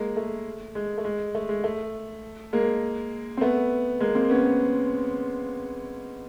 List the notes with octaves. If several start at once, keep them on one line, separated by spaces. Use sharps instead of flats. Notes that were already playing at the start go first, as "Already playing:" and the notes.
Already playing: G#3 A#3
A3
G#3
A3
G#3
A3
G#3
A3
G#3 A#3
C4
A3 B3
G#3 A#3
A#3 C4
B3 C#4